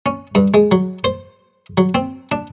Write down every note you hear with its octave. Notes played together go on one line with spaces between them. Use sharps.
C#4
G2
G#3
F#3
C5
F#3
C4
D4